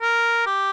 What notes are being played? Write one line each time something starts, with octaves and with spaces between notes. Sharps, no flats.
A#4
G4